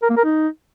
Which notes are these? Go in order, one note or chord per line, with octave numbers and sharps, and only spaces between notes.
A#4
A#3
A#4
D#4